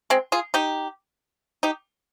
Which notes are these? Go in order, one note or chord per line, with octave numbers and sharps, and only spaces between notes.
G#3 C4
F4 G#4
D#4 G4
D#4 G4